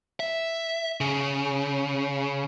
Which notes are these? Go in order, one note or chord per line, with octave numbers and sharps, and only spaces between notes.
E5
C#3